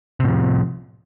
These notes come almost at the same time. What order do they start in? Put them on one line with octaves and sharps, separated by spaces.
C3 A2 F3